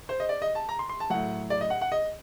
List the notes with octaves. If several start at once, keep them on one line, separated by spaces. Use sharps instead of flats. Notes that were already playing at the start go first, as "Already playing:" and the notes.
C5
D#5
D5
D#5
A5
A#5
C6
C6
A5
A2 F#3 F#5
D5
D#5
F#5
F#5
D#5